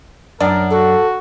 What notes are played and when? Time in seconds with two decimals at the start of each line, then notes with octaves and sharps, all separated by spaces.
0.41 F#2 D4 A#4
0.71 F#4 A4